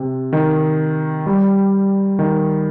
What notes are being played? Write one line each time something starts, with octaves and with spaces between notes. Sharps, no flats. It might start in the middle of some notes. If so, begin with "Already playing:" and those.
Already playing: C3
D#3
G3
D#3